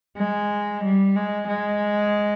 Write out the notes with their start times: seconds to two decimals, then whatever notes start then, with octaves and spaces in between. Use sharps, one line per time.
0.18 G#3
0.84 G3
1.16 G#3
1.48 G#3